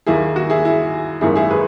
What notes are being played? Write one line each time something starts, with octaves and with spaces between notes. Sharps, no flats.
D#2 D#3 A#3 E4 G#4
F#4
E4 G#4
E4
G#1 F#2 D#3 A#3 E4 G#4
E4 G#4
G#4 B4